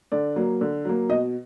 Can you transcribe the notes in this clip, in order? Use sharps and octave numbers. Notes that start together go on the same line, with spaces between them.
D3 D5
F#3 A#3
D3
F#3 A#3
B2 D#5